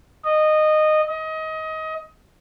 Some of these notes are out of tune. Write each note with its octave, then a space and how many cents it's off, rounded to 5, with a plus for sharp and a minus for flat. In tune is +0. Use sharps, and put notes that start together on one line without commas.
D#5 -15
D#5 +25